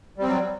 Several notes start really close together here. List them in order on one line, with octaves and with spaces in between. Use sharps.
G3 C4 F#3